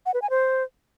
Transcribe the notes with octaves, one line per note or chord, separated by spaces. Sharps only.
F#5
B4
G#5
C5